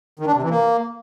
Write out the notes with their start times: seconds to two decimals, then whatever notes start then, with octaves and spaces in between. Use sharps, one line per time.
0.19 D#3
0.27 D4
0.35 C3
0.42 E3
0.50 A#3